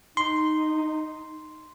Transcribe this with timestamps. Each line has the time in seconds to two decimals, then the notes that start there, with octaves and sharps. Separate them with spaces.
0.17 D#4 C6